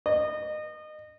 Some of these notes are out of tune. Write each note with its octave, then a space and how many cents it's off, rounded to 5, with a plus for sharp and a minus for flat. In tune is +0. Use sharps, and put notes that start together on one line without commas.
D#5 -30